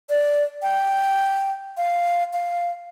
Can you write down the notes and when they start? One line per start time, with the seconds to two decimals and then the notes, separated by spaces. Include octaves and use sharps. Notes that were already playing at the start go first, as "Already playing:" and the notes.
0.10 D5
0.62 G5
1.77 F5
2.33 F5